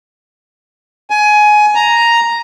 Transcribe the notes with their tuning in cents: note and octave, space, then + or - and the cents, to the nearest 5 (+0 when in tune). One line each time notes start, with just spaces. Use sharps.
G#5 +20
A#5 +0